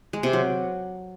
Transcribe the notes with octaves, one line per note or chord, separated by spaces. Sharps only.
G#3
C3
F#3